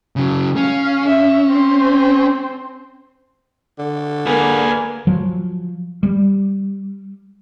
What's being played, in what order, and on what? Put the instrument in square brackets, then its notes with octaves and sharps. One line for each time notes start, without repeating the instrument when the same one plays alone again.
[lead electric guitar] C#3 F#3
[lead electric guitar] C#4 [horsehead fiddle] F5
[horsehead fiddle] E5
C4 C5
[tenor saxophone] D3
[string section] A#3 [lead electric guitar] G#4 B4 [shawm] G#5
[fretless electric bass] F3 F#3
G3